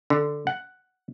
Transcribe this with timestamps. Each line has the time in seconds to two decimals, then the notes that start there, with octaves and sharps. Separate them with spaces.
0.10 D3
0.47 F#5